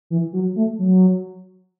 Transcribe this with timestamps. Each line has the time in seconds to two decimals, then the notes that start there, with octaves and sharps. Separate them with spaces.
0.10 E3
0.33 F#3
0.56 A3
0.79 F#3